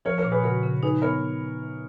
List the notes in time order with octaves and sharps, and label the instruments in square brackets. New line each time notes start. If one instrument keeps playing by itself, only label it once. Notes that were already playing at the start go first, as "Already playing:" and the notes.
[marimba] F3 [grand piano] A#4 C#5
[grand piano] A#4 C#5
[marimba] A#2
[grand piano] G#4 B4
[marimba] C#3 [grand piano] F#4 A#4
[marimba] C#3
[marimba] D#4 [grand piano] G#4 B4
[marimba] B3 [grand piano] A#4 C#5